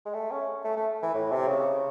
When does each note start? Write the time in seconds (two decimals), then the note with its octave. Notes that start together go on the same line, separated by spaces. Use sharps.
0.06 G#3
0.14 A3
0.31 C#4
0.64 A3
0.77 A3
1.03 E3
1.14 A2
1.32 C3
1.48 C#3